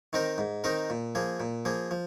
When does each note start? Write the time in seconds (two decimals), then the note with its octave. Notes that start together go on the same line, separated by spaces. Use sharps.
0.13 D#3 C4 D#4 A#4
0.38 G#2
0.64 D#3 C4 D#4 A#4
0.90 A#2
1.15 F3 A#3 G#4
1.40 A#2
1.65 F3 A#3 G#4
1.91 F3